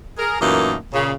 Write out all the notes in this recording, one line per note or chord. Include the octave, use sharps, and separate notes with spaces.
G#4 A#4
F#2 A#2 E3 A3 A#3 D#4
A#2 C#3